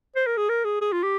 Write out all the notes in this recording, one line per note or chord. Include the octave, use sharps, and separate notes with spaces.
C5
A#4
G#4
A#4
G#4
G#4
F4
G4